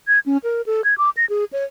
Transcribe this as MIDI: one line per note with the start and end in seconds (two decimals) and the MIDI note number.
0.08 0.19 92
0.26 0.37 61
0.44 0.62 70
0.66 0.82 69
0.84 0.94 92
0.98 1.10 86
1.17 1.25 94
1.30 1.44 68
1.53 1.64 73